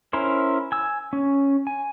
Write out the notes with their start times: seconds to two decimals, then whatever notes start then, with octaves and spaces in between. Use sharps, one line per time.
0.13 C#4 E4 A#4 C5
0.72 G#5 E6
1.13 C#4
1.67 G#5